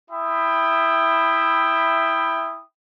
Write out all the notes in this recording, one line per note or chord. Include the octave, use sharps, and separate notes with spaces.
E4 E5 G5 B5 D#6